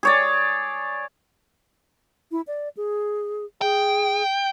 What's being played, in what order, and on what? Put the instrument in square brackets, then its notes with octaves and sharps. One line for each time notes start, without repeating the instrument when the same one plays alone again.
[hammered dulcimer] G#4 C#5 D5
[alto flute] E4
D5
G#4
[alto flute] G#4 [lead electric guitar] G5